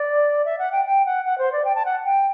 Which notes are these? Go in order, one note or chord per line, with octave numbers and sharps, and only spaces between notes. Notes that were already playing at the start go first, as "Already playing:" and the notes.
Already playing: D5
E5
F#5
G5
G5
F#5
F#5
C5
D5
G5
A5
F#5
G5